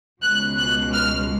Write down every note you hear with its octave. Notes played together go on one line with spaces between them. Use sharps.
C#2 B2 G#3 F#6
F#6
F6